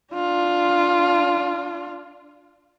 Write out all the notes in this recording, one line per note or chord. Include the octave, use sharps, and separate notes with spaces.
D4 F4